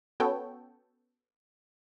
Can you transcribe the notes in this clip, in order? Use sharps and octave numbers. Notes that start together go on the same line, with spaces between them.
B3 C#4 F#4 A4 C#5 G5